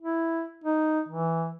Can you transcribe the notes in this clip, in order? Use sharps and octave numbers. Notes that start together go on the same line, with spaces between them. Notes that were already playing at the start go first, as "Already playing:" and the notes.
E4
D#4
E3